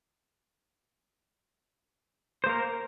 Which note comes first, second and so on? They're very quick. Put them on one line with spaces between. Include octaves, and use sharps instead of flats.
C5 A#3 A#4